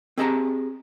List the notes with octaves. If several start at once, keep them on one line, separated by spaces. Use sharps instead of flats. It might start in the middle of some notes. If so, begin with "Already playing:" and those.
C4 G4 G#4 D#5 A5 A#5